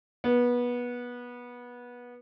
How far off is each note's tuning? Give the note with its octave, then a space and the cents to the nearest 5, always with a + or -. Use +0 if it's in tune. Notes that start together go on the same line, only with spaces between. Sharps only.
B3 -20